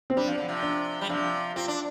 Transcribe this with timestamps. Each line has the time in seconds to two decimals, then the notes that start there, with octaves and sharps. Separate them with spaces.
0.10 C4
0.17 G3 D4
0.27 F3
0.38 D3
0.48 C3 F3
0.63 D4
1.01 G3
1.09 C3 F3 D4
1.56 C4 F4
1.68 D4